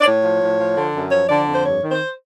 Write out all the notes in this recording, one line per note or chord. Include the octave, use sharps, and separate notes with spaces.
D5
A2 C#5
F3
A2
F3
D3
F#2
F3 C#5
D3 D5
F2
C5
G2 C#5
D#3
C5